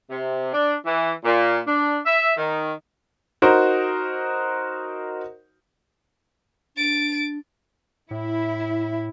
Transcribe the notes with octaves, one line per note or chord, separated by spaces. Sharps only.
C3
D4
E3
A#2
D4
E5
D#3
D#4 F#4 A#4 C5
D4 A6 D7
A2 E4